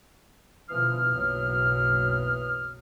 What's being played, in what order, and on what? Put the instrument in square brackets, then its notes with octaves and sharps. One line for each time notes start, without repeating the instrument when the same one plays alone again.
[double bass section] B2 D3 F3 [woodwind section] E3 D#6 F6
[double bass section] F#1 B1 F#3